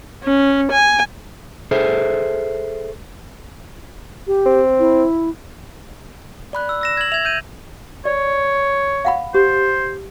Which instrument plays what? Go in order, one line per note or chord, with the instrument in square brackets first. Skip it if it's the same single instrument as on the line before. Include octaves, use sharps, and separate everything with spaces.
[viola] C#4
G#5
[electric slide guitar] G#4 A4 C5 E5
[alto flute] G4
[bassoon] C4
[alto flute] E4
[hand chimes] D5 B5 F#6
[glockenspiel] E6
E6 A#6 E7
G#6 F#7
[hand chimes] E5 [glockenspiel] G#6 F7
[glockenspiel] G6 D#7
[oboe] C#5 [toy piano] D5
[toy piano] F5 F#5 B5
[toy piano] G4 [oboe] C5